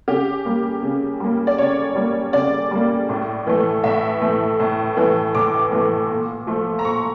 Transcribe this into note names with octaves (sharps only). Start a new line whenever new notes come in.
C#3 G4
G3 A#3
C#3
G3 A#3
D5
C#3 C#5
G3 A#3
C#3 D5
G3 A#3
A2
E3 A3
A2 E5
E3 A3
A2
E3 A3
A2 D6
E3 A3
A#2
F3 A3
A#5
A#2 C#6